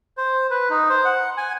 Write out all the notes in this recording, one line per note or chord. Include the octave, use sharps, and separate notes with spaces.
C5
B4
D#4
C5
F#5
G#5